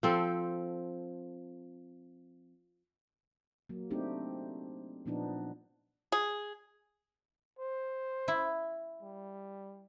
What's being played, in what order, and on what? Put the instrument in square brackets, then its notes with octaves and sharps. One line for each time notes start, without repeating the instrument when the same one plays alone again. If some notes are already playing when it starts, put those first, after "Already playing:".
[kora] F3 C4 A4
[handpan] F#3 A#3
A3 C4 D4 D#4 G4
A#2 F3 B3 D4 D#4
[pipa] G#4
[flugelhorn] C5
[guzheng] E4
[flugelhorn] G3